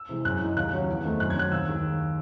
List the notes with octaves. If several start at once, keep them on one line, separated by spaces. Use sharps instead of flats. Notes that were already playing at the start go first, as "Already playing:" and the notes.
Already playing: E6
C3 E3 G#3
F#2 F#6
E3 G#3 D#4
D#2 F#6
C#3 F#3 C#4
E2
D#3 A3 C4 D#4
F#2 F#6
G#6
D#3 F#3 C4 F#6
D#2 E6
D#3 G#3